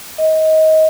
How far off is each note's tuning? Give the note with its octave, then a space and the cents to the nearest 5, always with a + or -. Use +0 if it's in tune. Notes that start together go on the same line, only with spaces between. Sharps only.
D#5 +25